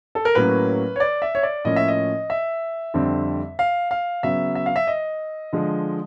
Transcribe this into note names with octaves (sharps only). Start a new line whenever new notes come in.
A4
A#4
A2 F#3 A#3 C#4 B4
C#5
D5
E5
C#5
D5
A2 F3 A#3 C#4 D#5
E5
D#5
E5
F2 D3 G3 C4
F5
F5
C#3 F#3 B3 E5
E5
F5
E5
D#5
D3 F3 G#3